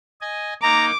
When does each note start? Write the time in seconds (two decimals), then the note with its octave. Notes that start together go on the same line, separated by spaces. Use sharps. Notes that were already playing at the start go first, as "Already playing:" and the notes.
0.21 D#5 G#5
0.63 A#3 D#4 A#5 D6